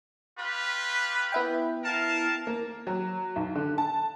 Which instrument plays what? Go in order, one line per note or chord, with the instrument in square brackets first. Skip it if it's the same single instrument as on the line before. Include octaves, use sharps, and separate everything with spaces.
[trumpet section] F4 G4 B4
[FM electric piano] B3 E4 G5
[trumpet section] A#4 F5 A5
[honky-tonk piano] A#3
F#3
B1
D3
A5